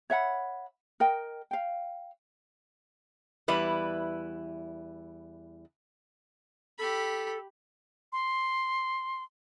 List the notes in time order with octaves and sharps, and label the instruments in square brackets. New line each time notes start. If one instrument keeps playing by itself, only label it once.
[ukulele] C#5 E5 F#5 B5
A#4 D#5 G5
F5 G5
[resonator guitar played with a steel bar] E2 G3 E4 B4
[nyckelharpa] G4 B5 [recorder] A4
[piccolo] C6